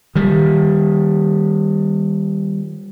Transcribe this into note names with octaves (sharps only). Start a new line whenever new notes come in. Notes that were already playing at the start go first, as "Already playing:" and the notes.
D#3 G3